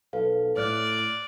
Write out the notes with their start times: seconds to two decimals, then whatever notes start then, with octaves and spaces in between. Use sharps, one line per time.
0.13 B1 A4 B4 F5
0.57 A2 D5 F6 F#6